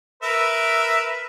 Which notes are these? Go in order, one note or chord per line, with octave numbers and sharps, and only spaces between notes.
A#4 B4 E5